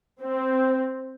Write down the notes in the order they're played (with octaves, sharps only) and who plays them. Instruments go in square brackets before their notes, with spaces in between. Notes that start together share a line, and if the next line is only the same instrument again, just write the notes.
[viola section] C4